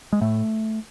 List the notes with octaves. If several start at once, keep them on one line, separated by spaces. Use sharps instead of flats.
G#3
A2 A3